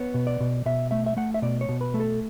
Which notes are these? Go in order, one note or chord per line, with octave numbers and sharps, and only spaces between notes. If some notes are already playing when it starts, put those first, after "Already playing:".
Already playing: B3 C#5
B2
D5
B2
B2 E5
A3 E5
E5
A3 F#5
E5
B2 D5
C#5
B2
B4
A3
A4